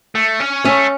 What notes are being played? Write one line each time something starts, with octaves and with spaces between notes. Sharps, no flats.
A3
C#4
A3 C#4